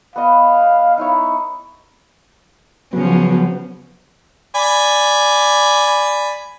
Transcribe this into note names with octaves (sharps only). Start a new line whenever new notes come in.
B3 D#5 F5
D#4 E4 C#5
C#3 F3 F#3 B3
D5 G#5 B5